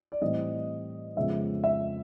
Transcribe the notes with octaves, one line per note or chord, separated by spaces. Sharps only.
D5
A2 E3 G3 C4 D#5
F2 C#3 F3 G#3 B3 E5
E5